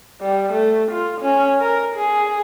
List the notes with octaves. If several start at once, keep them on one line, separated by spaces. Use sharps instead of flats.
G3
A3
F4
C#4
A#4
G#4